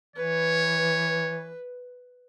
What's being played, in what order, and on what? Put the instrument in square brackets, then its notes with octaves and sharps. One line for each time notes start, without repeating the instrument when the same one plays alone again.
[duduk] E3 [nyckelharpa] B4 [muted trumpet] C#5